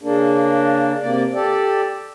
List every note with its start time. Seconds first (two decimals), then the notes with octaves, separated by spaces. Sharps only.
0.03 C#3 A#3 D4
1.01 C3 A#3 D5
1.34 G4 A4 D5